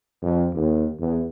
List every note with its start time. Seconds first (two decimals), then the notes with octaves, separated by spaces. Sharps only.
0.22 F2
0.54 D#2
1.00 E2